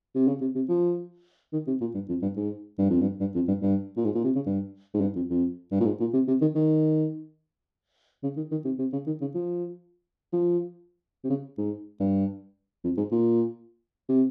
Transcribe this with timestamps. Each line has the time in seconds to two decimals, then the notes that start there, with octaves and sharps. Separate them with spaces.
0.15 C3
0.28 C#3
0.41 C3
0.55 C3
0.69 F3
1.53 D#3
1.67 C3
1.81 A#2
1.95 G2
2.09 F2
2.22 G2
2.37 G#2
2.79 G2
2.90 F2
3.01 G2
3.20 G2
3.35 F2
3.48 G2
3.62 G2
3.97 A#2
4.05 G#2
4.15 A#2
4.25 C3
4.36 C#3
4.46 G2
4.94 G#2
5.01 G2
5.16 F2
5.30 F2
5.72 G2
5.80 A#2
5.85 G#2
6.00 A#2
6.14 C3
6.28 C3
6.42 D#3
6.55 D#3
8.23 C#3
8.37 D#3
8.52 D#3
8.65 C3
8.79 C3
8.93 C#3
9.07 D#3
9.21 C#3
9.35 F3
10.33 F3
11.24 C3
11.30 C#3
11.58 G#2
12.00 G2
12.84 F2
12.98 G#2
13.12 A#2
14.09 C3